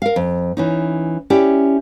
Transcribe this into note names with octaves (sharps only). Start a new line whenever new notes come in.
A#4 F5
F2
E3 C#4 D#4
C#4 E4 G4 D5